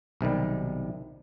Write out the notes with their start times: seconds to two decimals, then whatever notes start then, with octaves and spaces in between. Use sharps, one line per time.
0.21 B1 C3 D#3 G3